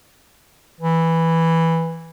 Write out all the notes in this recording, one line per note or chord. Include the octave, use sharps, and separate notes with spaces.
E3